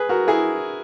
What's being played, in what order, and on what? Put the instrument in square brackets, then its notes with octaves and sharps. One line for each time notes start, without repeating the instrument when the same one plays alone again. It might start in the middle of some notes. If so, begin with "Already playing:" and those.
Already playing: [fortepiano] G#4 B4
F#4 A#4
E4 G#4